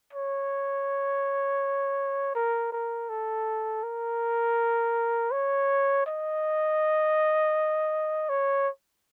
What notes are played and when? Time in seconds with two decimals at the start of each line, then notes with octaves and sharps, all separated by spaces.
0.13 C#5
2.35 A#4
2.72 A#4
3.09 A4
3.83 A#4
5.32 C#5
6.06 D#5
8.29 C#5